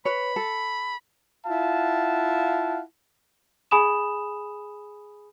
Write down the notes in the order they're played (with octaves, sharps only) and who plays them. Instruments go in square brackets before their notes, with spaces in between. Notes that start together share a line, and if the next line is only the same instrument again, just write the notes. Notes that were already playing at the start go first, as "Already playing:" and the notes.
[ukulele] B4 C#5 [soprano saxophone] B5
[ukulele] A4
[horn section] E4 F4 F5 F#5 A5
[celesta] G#4 G#5 B5 D#6 E7